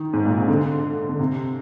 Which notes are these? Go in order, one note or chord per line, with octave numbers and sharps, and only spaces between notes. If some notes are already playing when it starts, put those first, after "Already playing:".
Already playing: D#3
G#2
A#2
C3
D3
D3
C3